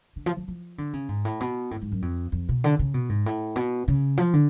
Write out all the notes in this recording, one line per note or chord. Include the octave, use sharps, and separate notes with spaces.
D3
F3
F3
F3
D3
C#3
G#2
A2
B2
A2
G#2
F#2
F2
F2
B2
D3
C#3
B2
G#2
A2
B2
C#3
F3
D3